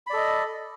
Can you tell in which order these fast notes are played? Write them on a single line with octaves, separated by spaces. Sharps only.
B5 D5 A4 D#5